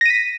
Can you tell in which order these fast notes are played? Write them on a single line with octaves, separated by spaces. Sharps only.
A#6 D#7 B6